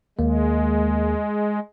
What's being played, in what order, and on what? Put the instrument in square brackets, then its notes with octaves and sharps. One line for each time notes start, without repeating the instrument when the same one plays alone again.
[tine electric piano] D#2 A#3 [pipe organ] G#3